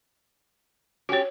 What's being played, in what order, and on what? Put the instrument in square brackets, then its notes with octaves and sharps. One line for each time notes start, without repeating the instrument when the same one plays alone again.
[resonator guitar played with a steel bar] C#4 G4 [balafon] F#4 C#5